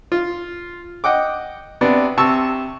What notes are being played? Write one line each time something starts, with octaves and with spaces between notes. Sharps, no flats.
F4
D#5 F#5 G5 D6
C3 B3 D4
C3 A5 C#6 E6